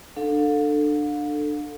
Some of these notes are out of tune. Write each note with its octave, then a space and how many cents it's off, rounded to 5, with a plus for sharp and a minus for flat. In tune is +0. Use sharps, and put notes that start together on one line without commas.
D4 +25 A4 +10 F5 +40